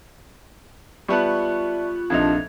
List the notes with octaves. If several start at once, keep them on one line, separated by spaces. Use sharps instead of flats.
G3 B3 F4 D5 E5 A5 C#6 F#6
A#1 F2 C3 D4 D#4 A5 G#6 F7